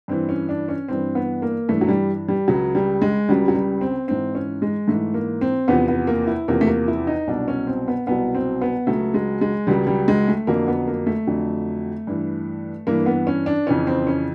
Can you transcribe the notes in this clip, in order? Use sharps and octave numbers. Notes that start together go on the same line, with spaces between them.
G2 E3 C4
C#4
D4
C#4
G2 E3 C4
B3
A#3
G2 E3 A3
F#3
G3
G3
C#2 C#3 F#3
G3
G#3
C#2 C#3 F#3 G3
F#3
G3
C4
G#2 E3 C4
C#4
G#3
G#2 E3 A3
A#3
C4
E2 C3 F3 B3
B3
A#3
E4
E2 C3 F3 A#3
A3
A#3
E4
D#4
C2 B2 F#3 D4
C#4
C4
B3
C2 B2 F#3 B3
C4
B3
C#2 C#3 F#3 A3
G#3
G#3
C#2 C#3 F#3 G3
G3
G#3
A3
F2 D3 F#3 A#3
B3
A#3
A3
F2 D3 F#3
G2 E3
G2 E3 A#3
B3
C#4
D4
F2 C#3 E3 C#4
C4
C#4